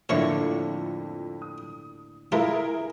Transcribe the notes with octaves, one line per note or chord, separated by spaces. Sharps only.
F2 A2 D3 A#3 C#5 E5 C#6
D#6
A3 E4 F4 G#4 A#4 E5